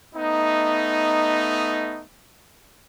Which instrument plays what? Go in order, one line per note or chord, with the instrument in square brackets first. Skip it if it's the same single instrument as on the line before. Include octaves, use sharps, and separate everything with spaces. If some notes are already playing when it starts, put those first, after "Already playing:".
[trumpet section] A3 B3 D#4